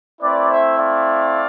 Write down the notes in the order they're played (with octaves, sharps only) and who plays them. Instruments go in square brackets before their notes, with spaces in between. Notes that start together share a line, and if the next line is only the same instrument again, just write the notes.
[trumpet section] A3 C4 E4 B4 D5
C5 E5
D5 F5